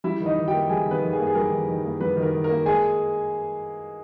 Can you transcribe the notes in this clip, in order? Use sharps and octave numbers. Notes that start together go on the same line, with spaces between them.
G3 E4 E5
D#3
D#4 D#5
D#3
A#3 G4 G5
G3 G#4 G#5
D#3
B3 B4
D#3
G#4
A#3
G#4
G3 A#4
D#3
D#3
A#3
G3 B3 B4
D#3
A#4
D#3
A#4
A#3
G#3 G#4 G#5